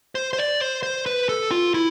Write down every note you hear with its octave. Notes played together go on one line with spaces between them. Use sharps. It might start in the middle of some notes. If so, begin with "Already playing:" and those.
C5
C5
D5
C5
C5
B4
A4
F4
E4